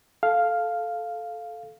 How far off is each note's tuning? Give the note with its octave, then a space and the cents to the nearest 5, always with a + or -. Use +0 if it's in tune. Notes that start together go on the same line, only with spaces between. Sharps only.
A4 -10 F5 +0